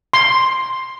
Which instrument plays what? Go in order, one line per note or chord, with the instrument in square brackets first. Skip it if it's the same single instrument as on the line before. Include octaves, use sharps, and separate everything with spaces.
[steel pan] C6